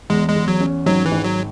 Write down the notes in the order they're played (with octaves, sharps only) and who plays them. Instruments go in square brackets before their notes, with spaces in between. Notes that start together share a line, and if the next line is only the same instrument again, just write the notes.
[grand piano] E2 [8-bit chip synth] G#3
[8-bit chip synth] G#3
[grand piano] E2
[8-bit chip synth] F#3
[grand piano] C#4
[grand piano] G#1 [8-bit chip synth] F#3
[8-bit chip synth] E3
[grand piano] G#1
[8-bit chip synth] F#3